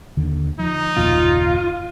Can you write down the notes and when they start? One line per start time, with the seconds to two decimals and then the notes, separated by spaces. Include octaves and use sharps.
0.17 D#2 D3 D#3
0.59 F3 D#4
0.97 F#1 D#2 A#2 F4